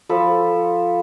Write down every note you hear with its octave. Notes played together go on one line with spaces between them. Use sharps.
F3 A4 B5